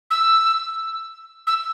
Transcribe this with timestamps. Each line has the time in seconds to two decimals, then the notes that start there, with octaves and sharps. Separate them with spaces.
0.11 E6
1.47 E6